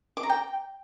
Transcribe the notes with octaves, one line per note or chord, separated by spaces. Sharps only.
D6
A#5
G5